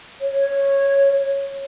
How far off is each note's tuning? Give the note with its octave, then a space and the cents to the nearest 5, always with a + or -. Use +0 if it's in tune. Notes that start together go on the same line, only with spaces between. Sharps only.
C#5 -10